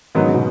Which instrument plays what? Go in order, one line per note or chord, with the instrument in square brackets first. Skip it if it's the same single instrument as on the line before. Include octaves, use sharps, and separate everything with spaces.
[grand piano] G#2 F#3 B3 D#4 [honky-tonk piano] D#3
[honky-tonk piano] C#3
B2